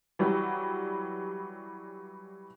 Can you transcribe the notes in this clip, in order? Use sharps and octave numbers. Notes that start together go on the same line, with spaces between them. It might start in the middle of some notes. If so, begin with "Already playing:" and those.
E3 F#3 G3